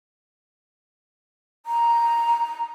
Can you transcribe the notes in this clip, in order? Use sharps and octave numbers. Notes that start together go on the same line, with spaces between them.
A#5